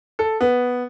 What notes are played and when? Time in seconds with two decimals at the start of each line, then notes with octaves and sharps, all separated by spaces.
0.19 A4
0.41 B3